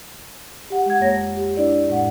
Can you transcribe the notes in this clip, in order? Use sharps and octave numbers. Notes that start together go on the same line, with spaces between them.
G4 F#5
G#3 F#5 G#6
F2 A#3 C#5 A#6
G4
D4 E4 D5
F2 A2 G#3 F#5